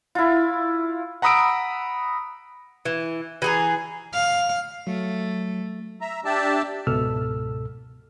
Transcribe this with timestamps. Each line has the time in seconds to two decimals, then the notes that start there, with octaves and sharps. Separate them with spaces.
0.15 E4 F4
1.22 F#5 A#5 B5 D#6 E6 D7
2.85 E3
3.42 E3 G#4 A#5
4.13 F5
4.87 F#3 A3
6.01 E5 A#5
6.25 D4 G4 D5 E5 A5
6.87 C#2 G#2 B2 A4 E6 F6